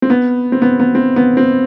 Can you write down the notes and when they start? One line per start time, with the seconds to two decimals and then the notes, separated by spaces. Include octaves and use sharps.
0.02 C4
0.10 B3
0.52 C4
0.62 B3
0.80 B3
0.95 C4
1.16 B3
1.37 C4